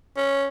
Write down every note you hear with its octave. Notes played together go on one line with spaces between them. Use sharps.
C#4